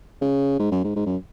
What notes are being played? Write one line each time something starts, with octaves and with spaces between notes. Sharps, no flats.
C#3
G#2
F#2
G#2
G#2
F#2